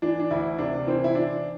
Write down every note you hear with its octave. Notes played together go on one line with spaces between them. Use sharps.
E3 D4
D4
D2 E4
C3 D4
E3 C4
E4
E3 D4